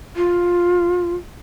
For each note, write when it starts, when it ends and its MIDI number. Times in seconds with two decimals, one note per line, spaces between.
0.16 1.15 65